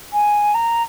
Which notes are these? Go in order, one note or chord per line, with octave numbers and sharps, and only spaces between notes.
G#5
A#5